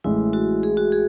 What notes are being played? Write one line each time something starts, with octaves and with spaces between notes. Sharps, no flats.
A1 A2 E3 G#3 E4
F#4
G#4
F#4
G#4